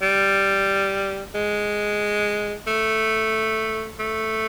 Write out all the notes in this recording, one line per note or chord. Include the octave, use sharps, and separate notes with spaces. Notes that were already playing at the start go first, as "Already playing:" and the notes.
G3
G#3
A3
A3